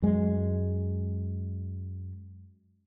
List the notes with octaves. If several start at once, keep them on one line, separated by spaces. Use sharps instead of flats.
F#2 G#3